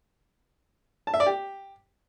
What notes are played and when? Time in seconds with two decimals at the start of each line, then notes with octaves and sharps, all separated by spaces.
1.07 A5
1.14 E5
1.20 D5
1.26 G4